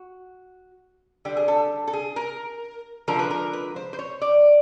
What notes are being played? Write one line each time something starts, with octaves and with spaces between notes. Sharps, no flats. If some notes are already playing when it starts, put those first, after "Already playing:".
Already playing: F#4
D3 G3 G4
G#4
A4
A4
G#4
A#4
D3 F3 G#3 A#4
B4
A#4
B4
C5
C5
C#5
D5